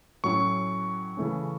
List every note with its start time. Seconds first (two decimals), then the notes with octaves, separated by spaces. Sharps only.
0.24 A2 F#3 C#4 E4 C#6
1.17 C#3 E3 A3 C#4